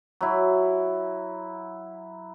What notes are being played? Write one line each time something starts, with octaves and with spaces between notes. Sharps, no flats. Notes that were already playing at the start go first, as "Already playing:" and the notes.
F#3 E4